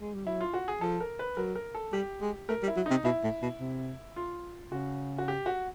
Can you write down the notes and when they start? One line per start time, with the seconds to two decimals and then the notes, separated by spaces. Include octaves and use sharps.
0.01 G#3
0.14 G3
0.26 F#3 E4
0.41 F4
0.54 F#4
0.68 G#4
0.81 F3 A4
1.00 A#4
1.19 B4
1.37 F#3 A#4
1.55 A#4
1.75 A4
1.93 G3 G4
2.22 G#3
2.49 A3 A#4
2.63 G3
2.68 E4
2.77 F#3
2.86 C3 D#4
3.04 B2 E4
3.23 A2
3.42 B2
3.60 C3
4.16 F4
4.71 C#3 F#4
5.18 F#4
5.28 G4
5.46 F#4